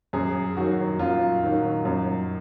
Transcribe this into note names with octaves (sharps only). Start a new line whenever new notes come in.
F#2 G#4
D#3 F#3 F#4
F#2 F4
D#3 F#3
F#2